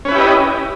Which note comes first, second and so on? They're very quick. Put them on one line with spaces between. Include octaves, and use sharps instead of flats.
C#4 B4 E4 G4 D#5